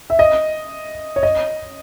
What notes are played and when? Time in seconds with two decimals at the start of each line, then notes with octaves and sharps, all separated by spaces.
0.10 E5
0.19 D#5
1.16 C#5
1.23 D#5